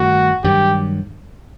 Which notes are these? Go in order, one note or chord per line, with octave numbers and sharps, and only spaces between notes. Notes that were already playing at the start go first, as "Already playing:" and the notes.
Already playing: G2 D#3 A3 F#4
G2 D#3 F#3 G4